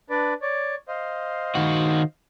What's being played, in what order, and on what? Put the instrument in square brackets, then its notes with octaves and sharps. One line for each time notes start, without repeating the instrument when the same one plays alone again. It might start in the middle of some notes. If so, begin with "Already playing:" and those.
[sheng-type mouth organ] D4 B4 D5
C#5 D5
C5 D#5 F5
[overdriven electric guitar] D#3 F#4